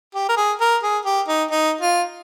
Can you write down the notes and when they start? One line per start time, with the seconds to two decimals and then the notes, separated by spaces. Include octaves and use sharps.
0.15 G4
0.29 A#4
0.37 G#4
0.61 A#4
0.83 G#4
1.05 G4
1.28 D#4
1.51 D#4
1.81 F4